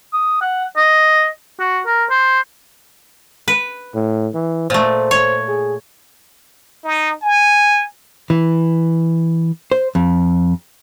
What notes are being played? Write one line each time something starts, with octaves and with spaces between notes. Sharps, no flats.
D#6
F#5
D#5
F#4
A#4
C5
B4
A2
E3
A#2 A3 C5
C#5
G#4
D#4
G#5
E3
C5
F2